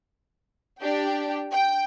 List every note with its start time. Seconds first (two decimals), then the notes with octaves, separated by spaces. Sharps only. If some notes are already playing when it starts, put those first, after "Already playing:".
0.81 D4 G4 G5
1.54 G5